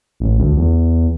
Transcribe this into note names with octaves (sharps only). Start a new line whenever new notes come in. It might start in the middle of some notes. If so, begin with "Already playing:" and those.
A1
D2
E2